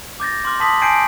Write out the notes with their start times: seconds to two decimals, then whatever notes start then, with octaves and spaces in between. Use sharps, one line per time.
0.20 D6 G6 A6 A#6
0.45 C6 D6 F6
0.60 A5 C6 D6 D#6 B6 F#7
0.82 G#5 A5 G6 G#6 C7 D7